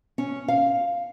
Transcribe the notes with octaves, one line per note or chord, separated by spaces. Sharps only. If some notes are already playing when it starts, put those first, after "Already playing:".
C#4
F5